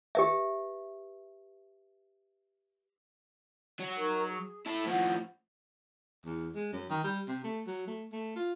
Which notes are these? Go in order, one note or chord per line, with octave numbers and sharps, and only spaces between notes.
G4 B4 E5
F#3
D#4 A#4 C#6
G#4
E4 A4
A2 F3 F#5
E2
G#3
F#2
D#3
G3
C3
A3
F#3
A3
A3
F4